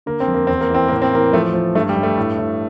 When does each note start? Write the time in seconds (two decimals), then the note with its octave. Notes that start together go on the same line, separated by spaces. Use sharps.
0.06 D3 A#3
0.20 C4
0.28 F2
0.34 A#3
0.47 E2 C4
0.61 A#3
0.70 E3 C4
0.88 A2 A#3
1.02 C4
1.12 E3 A#3
1.33 F3 A3
1.54 F3
1.75 G2 A3
1.89 G3
1.96 G2
2.03 A3
2.17 A2
2.38 A2